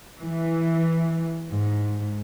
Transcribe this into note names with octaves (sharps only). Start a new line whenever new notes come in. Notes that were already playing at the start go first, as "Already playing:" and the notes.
E3
G#2